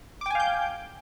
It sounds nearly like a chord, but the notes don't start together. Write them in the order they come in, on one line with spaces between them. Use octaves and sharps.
D6 G5 G#5 F5 G6